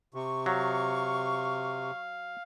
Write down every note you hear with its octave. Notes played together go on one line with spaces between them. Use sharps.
C3 C#6
F#3 F5